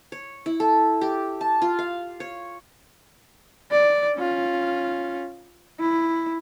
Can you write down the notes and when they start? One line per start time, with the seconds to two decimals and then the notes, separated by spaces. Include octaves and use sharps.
0.12 C#5
0.46 E4
0.60 A4
1.01 G4
1.41 A5
1.62 F4
1.79 F5
2.20 C#5
3.71 D5
4.16 C#4 F4
5.80 E4